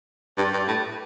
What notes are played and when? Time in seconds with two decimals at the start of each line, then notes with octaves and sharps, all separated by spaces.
0.38 G2
0.53 G2
0.68 A2